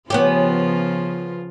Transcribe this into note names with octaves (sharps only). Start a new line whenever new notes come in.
C#3 F3 B3 C#4 F4 G4